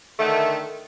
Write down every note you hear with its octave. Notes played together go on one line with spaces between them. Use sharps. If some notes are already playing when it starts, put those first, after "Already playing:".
D3 D#3 A3